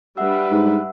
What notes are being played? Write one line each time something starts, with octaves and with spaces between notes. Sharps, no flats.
G3 D4 B4 E5 F#5 E6
G#2